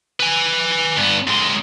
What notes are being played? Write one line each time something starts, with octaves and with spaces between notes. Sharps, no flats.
B4 G#5
G2 B3
F#2 G#3